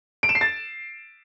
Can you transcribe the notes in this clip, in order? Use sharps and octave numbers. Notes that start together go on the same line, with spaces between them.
D7
E7
C7
A6